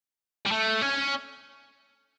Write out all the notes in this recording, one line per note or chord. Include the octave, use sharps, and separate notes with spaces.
G3
A3
C#4